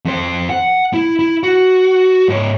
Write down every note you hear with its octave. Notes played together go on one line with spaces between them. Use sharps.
F2 C5
F#5
E4
E4
F#4
G#2 C#5